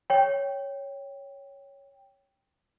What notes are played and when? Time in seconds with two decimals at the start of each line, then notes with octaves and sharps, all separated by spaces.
0.10 C#5 G5